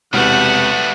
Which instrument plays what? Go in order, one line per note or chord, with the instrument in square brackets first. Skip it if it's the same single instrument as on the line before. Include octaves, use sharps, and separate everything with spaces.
[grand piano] E1 C3 F6 [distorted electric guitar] G3 A3 [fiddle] B3 F#4 [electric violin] F#5